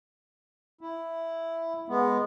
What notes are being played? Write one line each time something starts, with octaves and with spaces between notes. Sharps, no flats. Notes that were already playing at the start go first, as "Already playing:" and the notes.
E4
G#3 B3